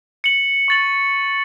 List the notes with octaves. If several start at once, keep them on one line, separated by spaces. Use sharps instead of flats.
C#7 F#7
C#6 A6 F#7